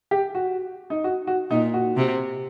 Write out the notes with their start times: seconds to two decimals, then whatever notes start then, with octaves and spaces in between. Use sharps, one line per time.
0.11 G4
0.35 F#4
0.90 D#4
1.04 F#4
1.27 F#4
1.51 A#2 D#4
1.74 F#4
1.97 C3